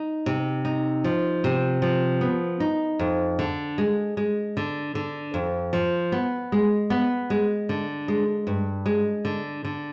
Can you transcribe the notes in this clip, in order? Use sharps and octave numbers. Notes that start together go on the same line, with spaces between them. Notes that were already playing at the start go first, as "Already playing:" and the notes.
Already playing: D#4
C3
D#4
F3
C3
F3
B3
D#4
F2
D3
G#3
G#3
D3
D3
F2
F3
B3
G#3
B3
G#3
D3
G#3
G2
G#3
D3
D3